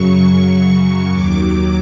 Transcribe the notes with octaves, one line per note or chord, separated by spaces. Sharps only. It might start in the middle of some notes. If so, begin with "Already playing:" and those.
Already playing: F#2 C#3 F#3 C#6
D#2 D#3 F#3 D6